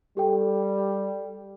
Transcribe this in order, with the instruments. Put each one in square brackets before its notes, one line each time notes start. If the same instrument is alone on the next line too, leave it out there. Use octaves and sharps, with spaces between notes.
[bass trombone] G3 [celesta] G4 A4 G5